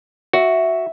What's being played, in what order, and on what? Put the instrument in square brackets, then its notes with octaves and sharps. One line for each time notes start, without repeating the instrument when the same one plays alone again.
[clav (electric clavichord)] F#4 [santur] E5